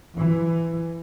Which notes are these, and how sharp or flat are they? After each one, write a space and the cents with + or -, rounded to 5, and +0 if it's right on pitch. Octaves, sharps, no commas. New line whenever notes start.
E3 +15